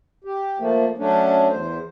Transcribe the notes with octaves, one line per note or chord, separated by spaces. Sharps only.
G4
F3 A3 A#3
F#3 A3 C#4 D4
E2 C5